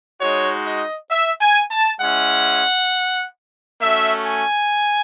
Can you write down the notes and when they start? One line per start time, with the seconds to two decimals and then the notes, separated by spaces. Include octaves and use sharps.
0.20 G#3 D#4 F#4 C#5
0.66 D#5
1.10 E5
1.41 G#5
1.71 A5
2.01 G#3 C#4 E4 F#5
3.81 A3 C#4 F#4 E5
4.26 G#5